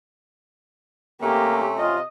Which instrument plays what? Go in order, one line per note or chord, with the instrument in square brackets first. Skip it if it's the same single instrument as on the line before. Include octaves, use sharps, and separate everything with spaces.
[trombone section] C3 C#4 [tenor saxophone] A3 [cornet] A#3 [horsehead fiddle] G4
[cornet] F4 [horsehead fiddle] D#5